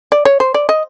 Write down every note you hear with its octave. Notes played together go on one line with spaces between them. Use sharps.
D5
C#5
C5
D5
D#5